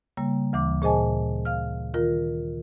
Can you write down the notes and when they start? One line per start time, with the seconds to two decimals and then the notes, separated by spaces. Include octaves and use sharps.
0.17 C#3 G3 A#3
0.53 D2 E3 D6
0.82 A#2 G#4 C5 D#5 G#5 A5
1.45 F5 F6
1.94 D#3 F4 A#4